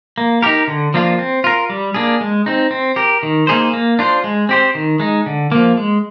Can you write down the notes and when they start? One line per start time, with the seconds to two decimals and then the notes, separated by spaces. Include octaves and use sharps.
0.18 A#3
0.42 D#4 G4 A#4
0.68 D3
0.94 F3 A#3 D4 F4
1.19 C4
1.44 F4 A#4
1.70 G3
1.94 A#3 D4 G#4
2.21 G#3
2.46 C4 D#4
2.71 C4
2.96 G4 A#4
3.23 D#3
3.47 A#3 D#4 G#4 C5
3.73 A#3
3.99 D4 F4 C5
4.24 G#3
4.49 C4 G4 C5
4.75 D#3
5.00 G#3 D#4
5.26 D3
5.52 F3 A#3
5.77 G#3